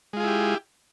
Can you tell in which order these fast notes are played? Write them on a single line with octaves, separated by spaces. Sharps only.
G#3 F4 G#4 E4 G4